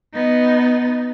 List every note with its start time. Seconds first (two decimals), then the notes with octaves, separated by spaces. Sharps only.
0.14 B3 D#4